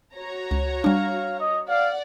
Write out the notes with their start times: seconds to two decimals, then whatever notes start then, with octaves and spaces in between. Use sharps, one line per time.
0.14 F#4 C#5 A#5
0.51 C#2
0.84 G3 D4 F5
1.40 D#5
1.69 D5 F5 F#5